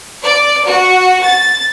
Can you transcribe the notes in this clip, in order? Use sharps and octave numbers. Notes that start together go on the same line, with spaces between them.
D5
F#4
A6